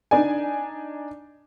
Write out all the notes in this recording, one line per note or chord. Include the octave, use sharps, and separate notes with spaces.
D4 D#4 D5 G#5